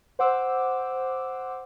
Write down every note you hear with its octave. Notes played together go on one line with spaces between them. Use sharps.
C5 F#5 D6 E6